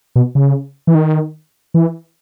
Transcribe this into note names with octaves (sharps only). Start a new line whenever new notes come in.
B2
C#3
E3
D#3
E3